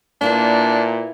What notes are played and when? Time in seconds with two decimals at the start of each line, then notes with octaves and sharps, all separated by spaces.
0.21 A#2 A#3 D4 E4 B4